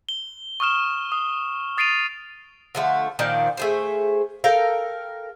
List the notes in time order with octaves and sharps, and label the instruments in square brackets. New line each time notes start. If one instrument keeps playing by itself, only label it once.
[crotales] G7
C#6 D#6 F6 E7
D#6
D#6 A6 C7 D7 D#7 F7
[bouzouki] D3 F3 A3
A#2 D#3 F3 D4
A3 G#4 C5
A4 A#4 F5 G5